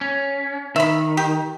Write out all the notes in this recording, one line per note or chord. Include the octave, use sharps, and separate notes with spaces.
C#4
D#3 E5 B5
G4